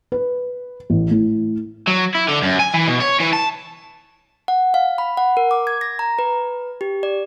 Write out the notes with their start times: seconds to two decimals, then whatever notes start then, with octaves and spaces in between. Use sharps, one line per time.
0.12 B4
0.90 A1
1.11 A2
1.88 F#3
2.15 E4
2.29 D3
2.43 F#2
2.59 G#5
2.74 E3
2.87 B2
3.00 C#5
3.20 E3
3.33 A5
4.48 F#5
4.74 F5
4.98 B5
5.17 F#5
5.37 A#4
5.51 D6
5.67 G#6
5.81 A#6
5.99 A#5
6.19 B4
6.81 G4
7.03 D5